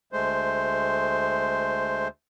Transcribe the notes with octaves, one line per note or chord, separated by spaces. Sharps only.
D2 G#3 A3 C5